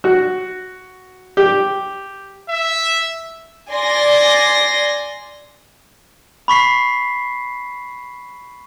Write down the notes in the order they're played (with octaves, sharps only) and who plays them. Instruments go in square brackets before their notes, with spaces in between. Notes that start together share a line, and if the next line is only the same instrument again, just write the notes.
[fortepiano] F#4
G4
[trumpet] E5
[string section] D5 G#5 C6 A#6
[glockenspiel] B5 C#6 B6 C7